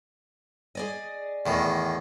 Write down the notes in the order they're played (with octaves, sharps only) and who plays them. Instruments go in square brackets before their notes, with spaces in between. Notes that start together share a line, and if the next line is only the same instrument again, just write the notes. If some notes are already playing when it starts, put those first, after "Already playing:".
[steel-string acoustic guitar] G#4 D5 D#5
[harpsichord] E2 A2 D#3